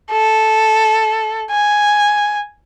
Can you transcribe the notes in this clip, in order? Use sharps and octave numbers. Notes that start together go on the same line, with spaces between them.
A4
G#5